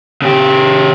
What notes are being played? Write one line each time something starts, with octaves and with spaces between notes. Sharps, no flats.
C#3 G4